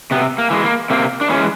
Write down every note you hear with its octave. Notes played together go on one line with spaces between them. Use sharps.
C3 B3
A#3
E3 G#3
A#3
C3 A#3 C4
D4
E3 G#3 B3 C#4